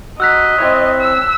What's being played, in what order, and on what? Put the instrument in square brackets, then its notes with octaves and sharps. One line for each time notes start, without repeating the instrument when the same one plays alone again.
[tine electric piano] F#4 A#5 [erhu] D#5 [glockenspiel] E6 F#6 B6
[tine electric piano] C4 E4 C#5
[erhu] E6